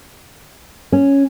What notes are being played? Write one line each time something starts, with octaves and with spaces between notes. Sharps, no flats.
C#4